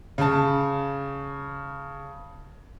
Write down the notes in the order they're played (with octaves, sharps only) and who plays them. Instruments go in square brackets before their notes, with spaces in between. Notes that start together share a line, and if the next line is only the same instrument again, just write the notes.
[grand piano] C#3 A5